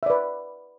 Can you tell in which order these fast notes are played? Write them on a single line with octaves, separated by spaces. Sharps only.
E5 D5 B4